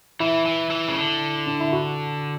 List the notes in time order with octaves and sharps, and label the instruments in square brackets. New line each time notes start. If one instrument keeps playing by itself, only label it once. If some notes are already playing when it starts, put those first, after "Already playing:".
[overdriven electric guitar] E3 [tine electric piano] E4
[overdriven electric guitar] E3
E3
C#3
D3
[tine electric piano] D4
E4
F#4